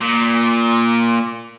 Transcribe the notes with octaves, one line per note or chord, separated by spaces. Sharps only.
A#2